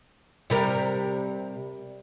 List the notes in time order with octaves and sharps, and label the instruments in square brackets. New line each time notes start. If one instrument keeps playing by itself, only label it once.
[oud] C3 G3 A#4